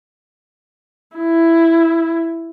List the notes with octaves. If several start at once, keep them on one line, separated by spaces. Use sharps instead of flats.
E4